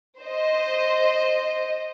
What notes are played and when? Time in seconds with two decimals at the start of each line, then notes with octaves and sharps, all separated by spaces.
0.19 C5 D#5